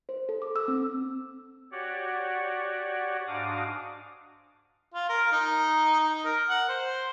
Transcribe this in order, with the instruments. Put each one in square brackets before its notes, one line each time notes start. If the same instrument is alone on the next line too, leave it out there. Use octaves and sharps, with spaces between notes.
[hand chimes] C5
A4
D6
E6
C4
[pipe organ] F#4 G4 C#5 D5 F#5
G#2 D4 F#4 F5 D6 D#6
[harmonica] F4
A#4
D#4
D#4
A#4
F#5
C5